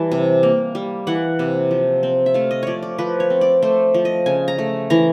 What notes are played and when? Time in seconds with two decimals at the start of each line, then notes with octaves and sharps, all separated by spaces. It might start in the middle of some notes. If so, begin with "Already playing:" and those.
Already playing: E3 G3 A5
0.12 C3
0.43 A#3
0.75 G3
1.07 E3 F#5
1.39 C3
1.71 F3
2.03 C4
2.26 E5
2.34 A3 F5
2.51 D#5
2.63 F3 C#5 D5
2.83 D5
2.98 F3 B4
3.20 C#5
3.30 C4
3.41 D5
3.62 A3 C5
3.94 F3
4.05 D#5
4.26 C#3 G#5
4.48 A#5
4.58 A3
4.90 E3 A#5